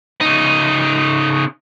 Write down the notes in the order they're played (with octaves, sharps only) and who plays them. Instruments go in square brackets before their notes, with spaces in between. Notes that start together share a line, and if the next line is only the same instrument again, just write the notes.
[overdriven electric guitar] C#3 D#4